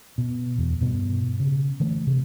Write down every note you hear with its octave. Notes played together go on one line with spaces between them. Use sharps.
B2
E2
G2 B2
C#3
D3 E3 A3
C3